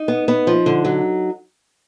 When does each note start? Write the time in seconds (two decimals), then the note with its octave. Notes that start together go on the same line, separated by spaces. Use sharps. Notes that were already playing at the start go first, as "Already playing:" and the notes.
Already playing: D#4
0.08 B3
0.28 B3
0.47 F3
0.66 D3
0.85 F#3